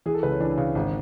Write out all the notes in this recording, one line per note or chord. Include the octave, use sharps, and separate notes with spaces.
E3 G#4
A4
C#2 B4
C#4
E3 D4
C#3
G#1